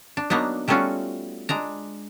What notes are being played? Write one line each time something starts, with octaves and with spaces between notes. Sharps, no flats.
D4
F#3 A#3 B3 D4 D#4
G3 A3 B3 C#4 F4 F#4
G#3 D4 A#5